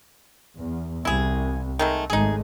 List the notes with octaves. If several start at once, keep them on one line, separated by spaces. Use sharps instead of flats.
E2
C2 E4 G#4
D#3 G#3 A3
G#1 G#3 A3 D#4 G#4